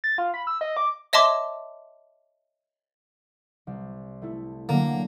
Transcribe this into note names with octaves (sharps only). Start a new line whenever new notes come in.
A6
F4
B5
E6
D#5
D6
C#5 D#5 E5 A5 C6 D6
C2
A3 E4
D3 F#3 A#3